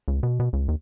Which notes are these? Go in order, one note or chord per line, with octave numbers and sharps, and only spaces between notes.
C#2
B2
B2
C#2
D#2